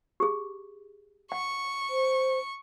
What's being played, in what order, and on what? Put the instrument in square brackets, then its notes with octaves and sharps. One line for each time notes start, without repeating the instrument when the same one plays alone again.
[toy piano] G4 G#4
[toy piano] F#5 [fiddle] C#6
[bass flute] C5